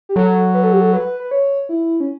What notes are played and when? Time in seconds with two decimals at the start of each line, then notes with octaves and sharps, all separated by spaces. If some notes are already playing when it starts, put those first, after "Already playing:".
0.09 G4
0.16 F#3 A4
0.54 B4
0.64 A4
0.72 G4
0.81 A4
0.93 B4
1.20 B4
1.31 C#5
1.69 E4
2.00 C#4